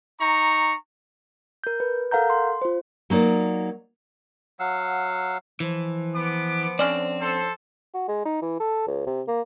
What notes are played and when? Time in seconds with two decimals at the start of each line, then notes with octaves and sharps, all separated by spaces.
0.19 D#4 A#5 C#6
1.64 A#4 G6
1.80 B4
2.11 A4 A#4 F5 F#5 A#5 G6
2.30 C6
2.62 F4 C5
3.10 F#3 A#3 D#4 D5
4.59 F#3 F5 F#5 E6
5.60 E3 F3
6.15 B3 D6
6.79 D3 C4 C#4 D5
7.20 A4 C5
7.94 F#4
8.08 G#3
8.25 D#4
8.42 E3
8.60 A4
8.87 C#2
9.07 C3
9.28 A#3